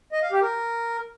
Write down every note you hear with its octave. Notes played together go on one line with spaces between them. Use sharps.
D#5
F5
G4
A#4